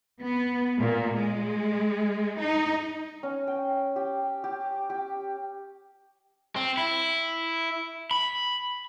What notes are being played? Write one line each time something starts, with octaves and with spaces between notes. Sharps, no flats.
B3
A#2
G#3
D#4
C#4
G5
G4
G4
G4
C4
E4
B5